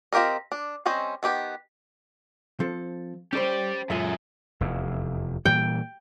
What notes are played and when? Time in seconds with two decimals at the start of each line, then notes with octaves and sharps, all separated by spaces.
0.13 C4 F4 G4 A#4 D#5
0.52 D4
0.86 G3 C4 C#4 C5 D#5
1.23 D#3 B3 G4 B4
2.60 F3 C4 A4
3.33 C#4 G4 A4 C5 D5
3.90 F#2 G#3 F4 A4 E5
4.61 F1 E2
5.45 A#2 E3 G3 G5